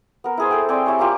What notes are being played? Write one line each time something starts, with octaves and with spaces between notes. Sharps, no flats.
B3 A#4
E4 G#4 C5
A4 G5
C4 G#4 D5 G5
E4 G4 G#4 C#5
A#3 E4 F4 G4